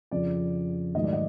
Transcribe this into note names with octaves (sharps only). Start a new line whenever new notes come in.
F2 C#3 F3 D5
G#2 D#3 F#3 A3 D#5
D5
D#5